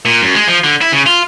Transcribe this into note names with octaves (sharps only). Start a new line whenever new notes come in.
A#2
F#2
G#3
F3
D3
E4
C#3
F4